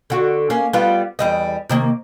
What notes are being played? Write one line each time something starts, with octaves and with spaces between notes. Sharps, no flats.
D3 F#4
A#3 C#4
G3 B3 F4
E2 G3 D#5
C3 D#3 A#3